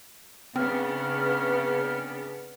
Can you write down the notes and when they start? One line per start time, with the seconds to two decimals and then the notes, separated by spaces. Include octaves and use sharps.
0.56 C#3 B3 C4 D4 B4 F6